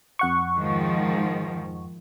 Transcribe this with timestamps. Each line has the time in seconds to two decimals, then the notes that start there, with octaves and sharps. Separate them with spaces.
0.19 F2 F#5 C#6
0.59 G#2 D#3 F3